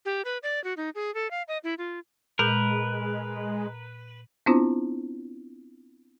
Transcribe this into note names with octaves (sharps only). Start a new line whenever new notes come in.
G4
B4
D5
F#4
D#4
G#4
A4
F5
D#5
E4
F4
A#2 G#3 A#4 B4 G6
B3 C4 D4 E4 F4 C5